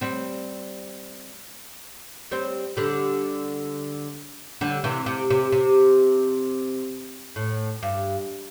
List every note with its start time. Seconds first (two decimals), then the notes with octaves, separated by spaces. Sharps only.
0.01 G3 C4
2.31 G3 C4
2.77 D3 G3
4.61 D3 G3
4.84 C3 E3
5.06 C3
5.30 C3
5.52 C3
7.36 A2
7.83 G2